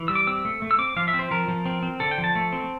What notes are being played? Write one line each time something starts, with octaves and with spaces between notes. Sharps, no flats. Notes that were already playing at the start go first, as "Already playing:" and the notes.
Already playing: E3
G3 E6
D6
C4 E6
A3
A3
E6
C4 D6
F3 F5
E5
C4
C5
F3 A#4
F3
C4
C4
D3 A4
G5
F3
A5
A3
C4